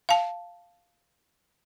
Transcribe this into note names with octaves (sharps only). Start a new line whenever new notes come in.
F5 A5